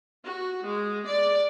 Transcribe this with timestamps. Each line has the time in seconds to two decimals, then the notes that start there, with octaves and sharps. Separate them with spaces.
0.23 F#4
0.63 G#3
1.04 D5